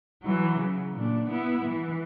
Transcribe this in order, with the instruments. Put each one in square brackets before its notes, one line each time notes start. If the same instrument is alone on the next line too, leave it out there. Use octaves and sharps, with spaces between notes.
[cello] E3 F#3
C#3
A#2 D4
B3 E4
E3